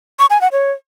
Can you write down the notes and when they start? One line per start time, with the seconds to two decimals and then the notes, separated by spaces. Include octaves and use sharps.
0.19 C#6
0.30 G#5
0.41 F#5
0.52 C#5